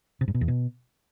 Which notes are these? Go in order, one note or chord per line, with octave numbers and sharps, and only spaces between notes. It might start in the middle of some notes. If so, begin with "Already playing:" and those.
C3
G2
B2
E2
B2